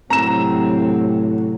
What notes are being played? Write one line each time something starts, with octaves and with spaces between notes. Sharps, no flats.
A2 C3 F#3 C4 A#5 E7